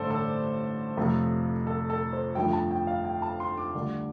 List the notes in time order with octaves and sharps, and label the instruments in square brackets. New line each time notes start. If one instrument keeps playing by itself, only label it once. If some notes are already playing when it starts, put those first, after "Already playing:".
Already playing: [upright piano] A1 G2 D3 A3 A4 C5 D5
A4
F2 C3 F3 A3
A4
A4
C5
G1 F2 F3 A3 G5
A5
G5
F5
G5
A5
C6
D6
D2 D3 G3